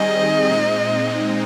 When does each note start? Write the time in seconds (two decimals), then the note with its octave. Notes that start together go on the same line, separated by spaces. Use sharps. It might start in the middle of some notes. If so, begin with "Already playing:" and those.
Already playing: D#3 G3 C4 D#4 G#4 D#5
0.50 A#2 G#3 C4 D#4